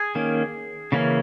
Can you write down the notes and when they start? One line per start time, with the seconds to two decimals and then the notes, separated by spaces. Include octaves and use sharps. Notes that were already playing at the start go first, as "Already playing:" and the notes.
Already playing: G#4 G#5
0.15 D#3 A#3 C#4
0.92 C#3 E3 A#3 C#4